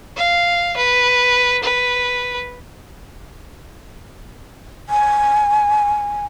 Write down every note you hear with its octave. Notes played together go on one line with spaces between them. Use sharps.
F5
B4
B4
G#5